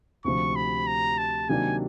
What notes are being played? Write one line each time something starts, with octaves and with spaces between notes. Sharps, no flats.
D2 C3 F3 C#6
B5
A#5
A5
C3 D#3 F#3 A#3 D4 G#5